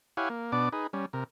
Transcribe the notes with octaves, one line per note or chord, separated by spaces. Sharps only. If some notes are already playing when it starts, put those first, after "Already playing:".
E4 G4 C#5 F5 F#5 G#5
A#3
B2 B3 D4 D5 D6
D#4 G#4 B4
G3 C#4
C3 A#4